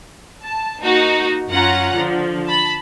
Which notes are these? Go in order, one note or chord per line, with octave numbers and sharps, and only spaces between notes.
A5
A#3 D#4 F#4
F#2 C#4 F4 F#5 A#5
D3 F3
A5 B5